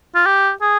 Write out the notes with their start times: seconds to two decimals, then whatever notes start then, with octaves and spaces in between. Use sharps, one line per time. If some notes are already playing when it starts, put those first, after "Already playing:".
0.15 F4
0.26 G4
0.61 G#4